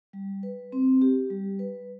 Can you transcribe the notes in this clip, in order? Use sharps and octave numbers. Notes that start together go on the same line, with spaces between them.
G3
B4
C4
G4
G3
B4